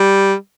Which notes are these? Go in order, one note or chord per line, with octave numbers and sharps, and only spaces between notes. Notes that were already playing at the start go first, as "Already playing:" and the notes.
Already playing: G3